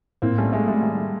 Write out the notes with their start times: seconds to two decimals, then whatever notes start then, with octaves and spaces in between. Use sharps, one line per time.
0.22 A2 A#3 C4
0.38 G3 A3 C#4
0.52 G#3 A3
0.68 G3 A3
0.83 D#3